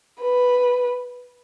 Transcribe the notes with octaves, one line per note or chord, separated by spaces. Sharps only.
B4